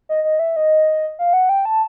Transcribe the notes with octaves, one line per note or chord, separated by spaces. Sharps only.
D#5
D#5
E5
D#5
F5
F#5
G5
A5